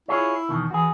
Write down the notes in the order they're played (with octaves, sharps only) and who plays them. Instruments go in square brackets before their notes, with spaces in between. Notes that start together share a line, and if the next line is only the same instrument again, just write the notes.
[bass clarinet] E4 [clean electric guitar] F4 G#4 C#5
[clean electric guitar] E2 B2 D#3
[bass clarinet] E3 [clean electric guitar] F#4 G#4